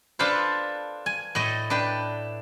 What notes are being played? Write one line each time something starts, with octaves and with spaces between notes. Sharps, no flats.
D4 F4 A4 B4 C5
G#5
A2 A3 D#5
D4 B4 G5